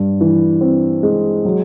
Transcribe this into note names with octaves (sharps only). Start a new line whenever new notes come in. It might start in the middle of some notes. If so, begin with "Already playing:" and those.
Already playing: G2
E3
C4
G#3
F#3